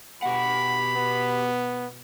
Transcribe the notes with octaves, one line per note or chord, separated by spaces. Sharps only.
B2 G4 F#5 B5
B3